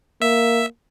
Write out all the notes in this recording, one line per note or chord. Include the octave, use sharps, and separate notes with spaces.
A#3 E5